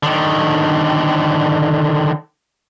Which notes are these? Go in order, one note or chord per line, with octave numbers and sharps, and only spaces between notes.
D3 D#3